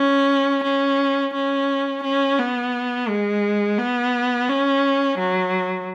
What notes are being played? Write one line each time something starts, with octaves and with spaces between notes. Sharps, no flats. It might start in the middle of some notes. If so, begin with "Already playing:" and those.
Already playing: C#4
C#4
C#4
C#4
B3
G#3
B3
C#4
F#3